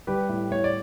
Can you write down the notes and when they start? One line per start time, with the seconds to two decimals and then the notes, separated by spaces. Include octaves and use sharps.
0.07 G3 G4 B4
0.29 A2
0.51 A2 C#5
0.64 D5